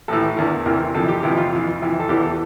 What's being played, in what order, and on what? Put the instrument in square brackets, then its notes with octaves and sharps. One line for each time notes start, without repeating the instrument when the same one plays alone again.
[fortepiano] A1 A2 E3 A4
E2 D3 A#4
E2 C3 E3 A#4
F2 C3 E3 A4
G4
F2 C3 E3 E4
F4
F2 E3
F2 C3 E3
A4
E2 E3 G4
A4